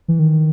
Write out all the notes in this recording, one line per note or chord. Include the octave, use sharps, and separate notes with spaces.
E3
D#3